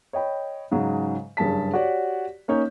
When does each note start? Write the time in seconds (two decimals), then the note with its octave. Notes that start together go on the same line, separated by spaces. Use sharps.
0.13 C#5 D#5 G5 B5
0.71 G#2 C#3 F#3
1.37 F#1 G2 G#4 A5 B6
1.74 F#4 G4 C#5 D5 F#5
2.48 A#3 C#4 D#4 C#5 G6